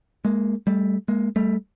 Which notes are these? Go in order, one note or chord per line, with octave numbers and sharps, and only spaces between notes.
G#3 A#3
G3 A3
G#3 A#3
G3 A3